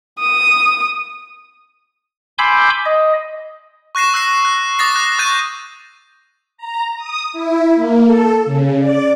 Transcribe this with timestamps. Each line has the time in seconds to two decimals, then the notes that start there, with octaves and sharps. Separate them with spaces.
0.20 D#6
2.38 G#5 B5 C6 D6 E6 G6
2.86 D#5
3.95 C#6 F#6 A#6 C7 E7
4.14 E6 F#6 C7
4.45 F#6
4.79 D6 D#6 A6 A#6 C7
4.96 F#6
5.19 C#6 F#6 G6 A6 D#7
6.58 A#5
6.97 D#6
7.33 E4
7.75 A#3
8.05 A4
8.45 C#3
8.79 D5